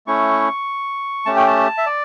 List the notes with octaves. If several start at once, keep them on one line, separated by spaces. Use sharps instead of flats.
A3 C#4 E4 C#6
A3 C#4 G4 A5
G5
A5
E5
D5